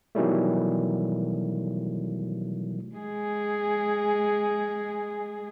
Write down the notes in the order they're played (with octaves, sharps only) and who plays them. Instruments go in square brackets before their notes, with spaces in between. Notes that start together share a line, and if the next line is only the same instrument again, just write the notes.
[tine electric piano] B2 D#3 E3 F#3 G3 A3
[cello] G#3 G#4